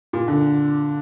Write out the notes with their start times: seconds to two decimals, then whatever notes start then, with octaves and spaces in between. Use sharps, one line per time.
0.13 A#2
0.28 D3